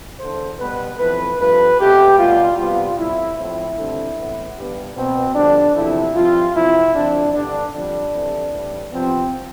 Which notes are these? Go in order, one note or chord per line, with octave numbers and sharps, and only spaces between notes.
E2 D3 A3 C5
B2 G3 B3 B4
F2 E3 A3 C4 B4
G2 F3 A3 C4 B4
B2 A3 C4 G4
B2 G3 B3 F4
C3 G3 B3 F4
A2 G3 C4 E4
A2 F3 C4 E4
G2 D3 A3 C4
A2 E3 B3
G2 E3 G3 B3
B2 B3 C4
F2 D3 G3 D4
E2 C3 F3 A3 E4
G2 F3 C4 F4
E2 C3 F3 C4 E4
F2 D3 A3 C4 D4
G2 D3 G3 B3 D4
F2 D3 G3 D4
C3 E3 A3 C4
A2 E3 G3
C3 F3 B3 C4